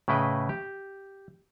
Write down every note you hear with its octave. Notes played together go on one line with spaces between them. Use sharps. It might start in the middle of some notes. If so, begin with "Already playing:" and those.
A2 C#3 E4 B4 D#5 G5
G4